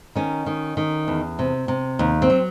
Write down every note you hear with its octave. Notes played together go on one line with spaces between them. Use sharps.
D#3 C#4
D#3
D#3
E2
C3
C3
D#2
C4
F#3